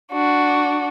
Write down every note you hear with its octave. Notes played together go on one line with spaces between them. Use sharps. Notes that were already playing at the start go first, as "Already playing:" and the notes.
D4 F#4